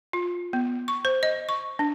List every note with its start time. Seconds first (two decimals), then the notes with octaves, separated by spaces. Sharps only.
0.13 F4
0.53 B3
0.88 C#6
1.05 C5
1.23 D#5
1.49 C#6
1.79 D4